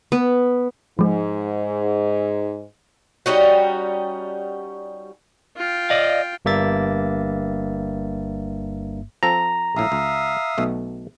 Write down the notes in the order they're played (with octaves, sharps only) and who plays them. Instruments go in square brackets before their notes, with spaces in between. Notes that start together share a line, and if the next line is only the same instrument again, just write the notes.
[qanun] B3
[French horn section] G#2 [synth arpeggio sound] F3 G#3
[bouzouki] G3 C#4 D#4 F#4
[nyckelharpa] F4 G5
[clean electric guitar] D5 D#5 F5
[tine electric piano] G1 G2 A#3 E5 A6
[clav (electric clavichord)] F3 C4 A4 [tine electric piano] A#5
[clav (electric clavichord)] A#1 A2 [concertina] E5 F5 D#6
[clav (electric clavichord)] C#2
B1 B2 A3